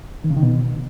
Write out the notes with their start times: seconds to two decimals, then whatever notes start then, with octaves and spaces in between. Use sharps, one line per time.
0.24 D#3
0.30 C#3
0.37 D#3
0.43 B2